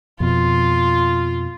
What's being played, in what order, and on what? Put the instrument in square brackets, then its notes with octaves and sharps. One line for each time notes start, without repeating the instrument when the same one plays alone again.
[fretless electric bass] F2 B2 [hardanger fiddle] F4